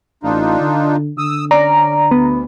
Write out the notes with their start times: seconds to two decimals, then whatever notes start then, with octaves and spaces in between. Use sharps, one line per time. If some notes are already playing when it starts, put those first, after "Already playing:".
0.23 A1 D4 D#4 F4
0.60 D3
1.18 D3 D#6 E6
1.51 C#4 D5 A#5
2.11 D2 B3